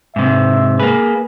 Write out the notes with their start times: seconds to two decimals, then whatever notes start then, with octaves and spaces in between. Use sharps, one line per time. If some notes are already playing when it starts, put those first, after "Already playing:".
0.16 G#2 C3 E5
0.80 A#3 G#4 B4